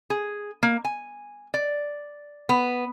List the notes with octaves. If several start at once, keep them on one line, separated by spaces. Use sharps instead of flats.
G#4
A#3
G#5
D5
B3